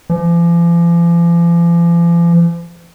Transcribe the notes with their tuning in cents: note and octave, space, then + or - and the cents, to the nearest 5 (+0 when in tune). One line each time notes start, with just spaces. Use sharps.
F3 -45